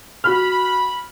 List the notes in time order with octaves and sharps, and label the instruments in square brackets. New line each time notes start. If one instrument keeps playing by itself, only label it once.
[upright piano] F#4 F6 [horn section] B5